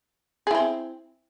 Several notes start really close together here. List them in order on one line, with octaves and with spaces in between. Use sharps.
G#4 E4 C4